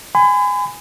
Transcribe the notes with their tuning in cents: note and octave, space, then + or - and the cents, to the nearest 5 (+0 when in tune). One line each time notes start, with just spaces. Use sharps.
G#5 -10 B5 +40